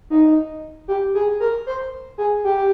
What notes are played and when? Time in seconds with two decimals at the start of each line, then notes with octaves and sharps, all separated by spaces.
0.10 D#4
0.88 G4
1.14 G#4
1.40 A#4
1.67 C5
2.18 G#4
2.44 G4